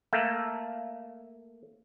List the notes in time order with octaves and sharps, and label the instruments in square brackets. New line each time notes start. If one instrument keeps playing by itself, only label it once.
[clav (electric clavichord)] A3 A#3